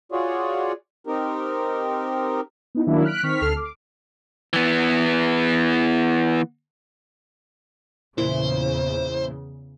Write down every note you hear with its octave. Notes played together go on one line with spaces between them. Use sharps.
F4 F#4 G#4 C#5 D5
C4 D#4 G4 A#4
B3 D#4 E4
D#3 F#3 A#3 D4 E4
F6 F#6 B6 D7
D#3 C4 C#6 F6 B6
D2 A4 F6 C7
D6
E3 B3
E2 A#2 C#3 E3 E4 C5